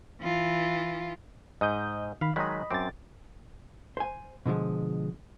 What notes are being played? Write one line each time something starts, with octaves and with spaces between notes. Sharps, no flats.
E3 F4
G#2 D#5 D#6 G6
D#3 F5 B5
D#3 F#3 G#3 D#5 B5
F#2 C4 D6 A6
C5 G#5
B2 D3 F3 G#3